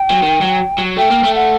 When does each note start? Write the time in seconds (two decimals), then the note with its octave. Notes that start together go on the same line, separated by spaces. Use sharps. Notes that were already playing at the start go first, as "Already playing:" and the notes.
Already playing: G5
0.11 F#3
0.23 D#3
0.42 F#3
0.79 F#3
0.97 A3 G5
1.11 A#3
1.24 A3
1.35 F#5